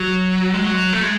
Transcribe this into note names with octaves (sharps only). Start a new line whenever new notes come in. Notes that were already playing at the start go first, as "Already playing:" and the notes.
Already playing: F#3
G#3
F#3
A3
G#3